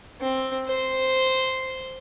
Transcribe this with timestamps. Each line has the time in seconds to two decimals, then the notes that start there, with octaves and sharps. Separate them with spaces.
0.21 C4
0.66 C5